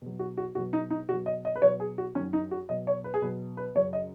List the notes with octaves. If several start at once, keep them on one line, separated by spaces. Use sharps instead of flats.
B2 F#3
F#4
F#4
B2 F#3 F#4
D#4
D#4
B2 F#3 F#4
D#5
D#5
B4
B2 F#3 C#5
G#4
F#4
F#2 D#3 F#3 C#4
D#4
F#4
B2 F#3 D#5
C#5
B4
G#4
B2 F#3 B4
B4
F#2 C#3 F#3 C#5
D#5